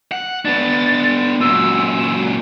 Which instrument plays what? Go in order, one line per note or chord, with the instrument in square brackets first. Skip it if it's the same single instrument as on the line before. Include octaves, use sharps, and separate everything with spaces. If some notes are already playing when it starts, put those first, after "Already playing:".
[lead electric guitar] F#5
[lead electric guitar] B3 D4 [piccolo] A6
[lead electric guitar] F#2 A#2 [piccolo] E6
[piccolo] E7